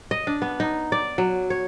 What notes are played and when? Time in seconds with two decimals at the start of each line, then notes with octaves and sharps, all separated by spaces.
0.11 D#5
0.27 D4
0.42 B3
0.60 D#4
0.92 D5
1.18 F#3
1.50 C#5